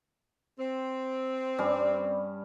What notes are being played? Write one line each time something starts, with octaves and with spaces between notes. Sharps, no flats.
C4
G2 G3 C#4